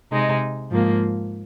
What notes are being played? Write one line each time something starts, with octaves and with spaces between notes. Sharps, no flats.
C3 G#3 D#4
G#2 F3 A#3